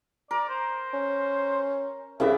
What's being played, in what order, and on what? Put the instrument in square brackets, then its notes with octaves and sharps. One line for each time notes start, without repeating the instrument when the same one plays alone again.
[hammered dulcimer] A#4 [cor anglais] D5
[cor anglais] C5
[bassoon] C#4
[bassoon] C2 [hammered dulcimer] C#3 E3 B3 [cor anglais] E5